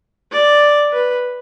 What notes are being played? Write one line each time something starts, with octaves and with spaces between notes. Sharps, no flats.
D5
B4